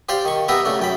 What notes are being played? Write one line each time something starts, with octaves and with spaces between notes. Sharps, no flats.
G4 C5 D5 F5 G5
D#3 C#6
B3 G4 B4 E5 G5 A#5
C#3 A3 D4
F#2 G5 B5